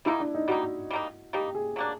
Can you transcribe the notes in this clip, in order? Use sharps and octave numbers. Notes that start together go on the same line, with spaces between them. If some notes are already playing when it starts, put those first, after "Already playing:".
G3 A#3 D#4 E4
D4
D#4
G3 A#3 D#4 F#4
G3 A#3 D#4
G3 A#3 D#4 G4
G#4
F#3 A#3 D4